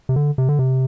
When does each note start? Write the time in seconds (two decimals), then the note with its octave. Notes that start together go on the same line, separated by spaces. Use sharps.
0.09 C3
0.16 D3
0.38 C3
0.49 D3
0.59 C3